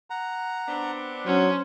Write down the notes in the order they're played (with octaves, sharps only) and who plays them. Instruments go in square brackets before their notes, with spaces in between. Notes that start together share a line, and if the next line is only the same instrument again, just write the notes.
[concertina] F#5 A#5
[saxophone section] B3 C4 D4
[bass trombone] F#3 [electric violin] C#4 [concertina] C5